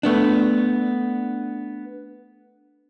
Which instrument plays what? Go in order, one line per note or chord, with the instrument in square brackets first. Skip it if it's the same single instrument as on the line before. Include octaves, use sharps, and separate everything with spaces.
[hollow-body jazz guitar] A3 B3 D4